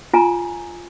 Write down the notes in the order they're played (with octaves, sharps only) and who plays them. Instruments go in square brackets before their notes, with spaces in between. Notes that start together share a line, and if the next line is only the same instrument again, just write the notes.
[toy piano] F4 G#5 A#5